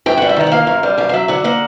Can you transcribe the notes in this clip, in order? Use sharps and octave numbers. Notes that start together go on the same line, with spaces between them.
F#2 G5
G3 F#5
E5
D#3 F#5
F#5
A#3 F5
F#2
G3
F#2 F5
F5
F#3 E5
D3 F#5
A#3 F#5